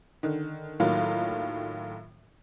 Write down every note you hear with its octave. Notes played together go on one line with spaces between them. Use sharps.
D3 D#3
A2 D#3 F#3 A#3 F4